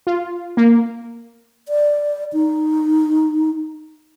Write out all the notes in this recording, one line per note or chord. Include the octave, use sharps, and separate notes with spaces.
F4
A#3
D5
D#4